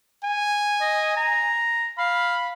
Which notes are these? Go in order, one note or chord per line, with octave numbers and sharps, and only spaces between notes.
G#5
D#5
A#5
F5 B5